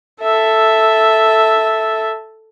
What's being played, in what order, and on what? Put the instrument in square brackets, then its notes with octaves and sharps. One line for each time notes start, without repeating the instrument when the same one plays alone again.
[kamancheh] A4 E5